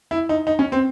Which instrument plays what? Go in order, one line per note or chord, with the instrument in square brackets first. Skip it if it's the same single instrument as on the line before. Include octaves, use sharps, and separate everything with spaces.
[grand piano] E4
D#4
D#4
C#4
C4